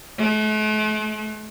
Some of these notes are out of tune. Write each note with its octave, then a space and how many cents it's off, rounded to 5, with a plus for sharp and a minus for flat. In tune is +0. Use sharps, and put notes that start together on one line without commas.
A3 -45